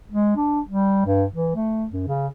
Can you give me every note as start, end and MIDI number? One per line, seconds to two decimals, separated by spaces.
0.12 0.35 56
0.37 0.61 62
0.68 1.05 55
1.06 1.25 43
1.34 1.55 52
1.55 1.87 57
1.92 2.04 42
2.08 2.28 49